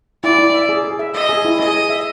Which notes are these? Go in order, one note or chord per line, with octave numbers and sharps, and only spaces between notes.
E4 D5
E4
E5
G#4
G#4
E5
D#5 E5
G#4
E4
G#4 D#5
G#4
E5